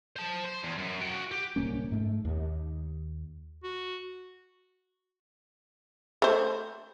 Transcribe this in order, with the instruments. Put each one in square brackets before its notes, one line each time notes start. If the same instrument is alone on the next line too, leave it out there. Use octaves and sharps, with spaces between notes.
[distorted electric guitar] C5 A5
C5
E2
F#2
F#4 G5
G4
[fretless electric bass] D1 C2 A#3 C#4
G#2 A3
D#2
[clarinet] F#4
[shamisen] A3 C5